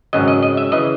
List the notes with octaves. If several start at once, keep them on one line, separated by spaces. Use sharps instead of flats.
G#1 F#2 C#3 F#3 D#5
D#5
D#5
E5
C#3 E3 D#5